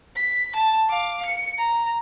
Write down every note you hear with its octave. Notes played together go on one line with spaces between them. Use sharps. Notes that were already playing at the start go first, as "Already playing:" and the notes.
B6
A5
F5 D6
C#7
A#5